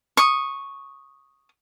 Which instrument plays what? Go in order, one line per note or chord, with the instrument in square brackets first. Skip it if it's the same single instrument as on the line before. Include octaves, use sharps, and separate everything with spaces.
[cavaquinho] C#6 D#6